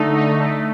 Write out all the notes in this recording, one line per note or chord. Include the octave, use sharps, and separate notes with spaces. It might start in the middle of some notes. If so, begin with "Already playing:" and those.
Already playing: D3 A3 D#4
D#4
A3